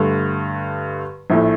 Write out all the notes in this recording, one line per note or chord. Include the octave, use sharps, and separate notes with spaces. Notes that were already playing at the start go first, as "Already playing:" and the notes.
Already playing: G2 D3 A3
A#1 A2 A3